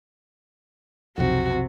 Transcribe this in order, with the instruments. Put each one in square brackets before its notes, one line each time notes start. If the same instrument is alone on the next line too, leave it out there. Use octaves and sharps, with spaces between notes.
[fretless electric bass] B1 F2 [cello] C3 [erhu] F#4